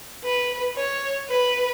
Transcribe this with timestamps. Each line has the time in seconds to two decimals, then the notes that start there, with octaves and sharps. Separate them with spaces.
0.24 B4
0.76 C#5
1.30 B4